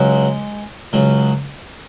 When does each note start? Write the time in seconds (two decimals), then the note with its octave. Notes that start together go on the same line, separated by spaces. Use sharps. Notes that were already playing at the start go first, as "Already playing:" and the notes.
Already playing: C#2 F#3 G#3
0.93 C#2 C#3 F#3